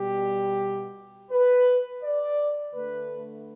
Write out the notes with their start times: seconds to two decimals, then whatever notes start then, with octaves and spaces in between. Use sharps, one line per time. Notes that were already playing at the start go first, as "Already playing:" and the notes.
Already playing: B2 G3 G4
1.31 B4
2.03 D5
2.74 D3 A3 B4